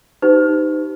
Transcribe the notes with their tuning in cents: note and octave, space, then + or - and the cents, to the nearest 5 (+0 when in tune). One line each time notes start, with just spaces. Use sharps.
D#4 -5 G4 -20 C5 -45